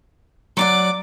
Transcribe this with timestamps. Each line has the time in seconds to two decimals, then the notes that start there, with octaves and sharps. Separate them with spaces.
0.57 F#3 D5 F#5 D6